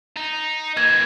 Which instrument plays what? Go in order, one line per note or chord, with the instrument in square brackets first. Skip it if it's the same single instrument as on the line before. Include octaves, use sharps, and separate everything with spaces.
[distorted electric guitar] D#4
[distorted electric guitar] E3 A#3 [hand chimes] G#6